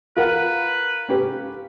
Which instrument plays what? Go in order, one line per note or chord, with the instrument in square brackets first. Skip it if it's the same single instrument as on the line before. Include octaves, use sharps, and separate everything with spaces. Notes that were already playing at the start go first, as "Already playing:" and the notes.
[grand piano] F4 A#4 F#5 [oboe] B4
[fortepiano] C#4 G4 B4